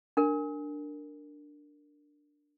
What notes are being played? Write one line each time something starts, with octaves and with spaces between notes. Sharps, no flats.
D4 A#4